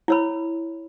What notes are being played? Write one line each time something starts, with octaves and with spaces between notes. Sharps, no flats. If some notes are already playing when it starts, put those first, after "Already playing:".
E4 C#5 B5